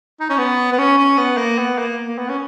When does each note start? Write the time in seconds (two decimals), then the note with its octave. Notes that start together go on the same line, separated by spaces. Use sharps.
0.20 D#4
0.30 C#4
0.38 B3
0.73 B3
0.79 C#4
0.98 C#4
1.17 B3
1.38 A#3
1.58 B3
1.78 A#3
2.08 A#3
2.18 B3
2.29 C#4